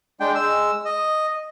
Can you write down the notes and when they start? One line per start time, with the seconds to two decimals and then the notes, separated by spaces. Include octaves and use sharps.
0.20 G#3 D4 G5
0.35 G#3 E6
0.85 D#5